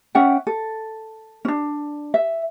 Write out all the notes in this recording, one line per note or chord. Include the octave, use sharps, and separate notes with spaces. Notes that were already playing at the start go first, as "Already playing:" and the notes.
C#4 E5 F#5 G5
A4
C#4 D4
E5